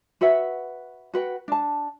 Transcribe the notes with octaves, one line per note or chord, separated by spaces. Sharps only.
F#4 B4 E5 F#5
F#4 B4 F#5 G5
D4 A5